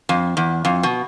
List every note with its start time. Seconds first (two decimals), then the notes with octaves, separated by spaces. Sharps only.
0.09 F2
0.37 E2
0.65 F2
0.83 B2